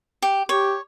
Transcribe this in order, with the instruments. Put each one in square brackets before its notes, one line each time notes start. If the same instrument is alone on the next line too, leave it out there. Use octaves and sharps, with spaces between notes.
[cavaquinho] G4
[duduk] G4 [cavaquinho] C#5